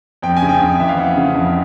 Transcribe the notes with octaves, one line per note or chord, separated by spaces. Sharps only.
F2 G5
G#5
C#3
G5
F2
E3 E5
F5
F2 F#5
C#3
F2